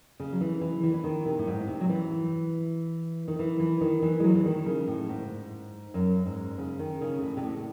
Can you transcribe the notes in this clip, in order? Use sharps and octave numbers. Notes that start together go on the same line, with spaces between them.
C#3
F#3
E3
E3
E3
E3
D#3
C3
A2
G#2
C3
F#3
E3
D#3
E3
E3
D#3
E3
G#3
F#3
E3
D#3
C#3
A2
G#2
F#2
G#2
C#3
D#3
C#3
A2
C3
A2